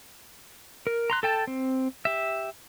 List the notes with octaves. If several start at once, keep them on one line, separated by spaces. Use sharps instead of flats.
A#4
A#5 C6 F#6
A4 G5 A5
C4
G4 E5